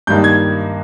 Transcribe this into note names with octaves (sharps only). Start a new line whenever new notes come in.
G2 D#3 G3 A#3 D#4 G6
G#6